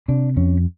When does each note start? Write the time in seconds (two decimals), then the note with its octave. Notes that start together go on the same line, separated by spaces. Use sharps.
0.08 C3 D4
0.36 F2 C#4